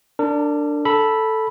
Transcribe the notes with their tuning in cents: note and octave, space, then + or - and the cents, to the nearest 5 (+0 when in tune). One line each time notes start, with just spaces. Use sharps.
D4 +0 A#4 -35
A4 +0 B5 -10